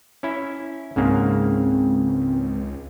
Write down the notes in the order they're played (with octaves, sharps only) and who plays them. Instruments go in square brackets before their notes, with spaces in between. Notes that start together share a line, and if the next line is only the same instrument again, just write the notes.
[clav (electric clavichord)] C#4 E4
[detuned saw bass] C#2 [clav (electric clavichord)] G#2 C#3 A#3 [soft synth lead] C4